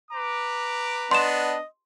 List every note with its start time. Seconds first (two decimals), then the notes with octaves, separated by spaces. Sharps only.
0.11 B4 A#5 D6
1.11 B3 D4 D#5 C6 E7